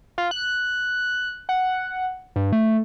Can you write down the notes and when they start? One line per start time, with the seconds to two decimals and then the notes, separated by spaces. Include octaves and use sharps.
0.18 F4
0.31 F#6
1.49 F#5
2.36 G2
2.53 A3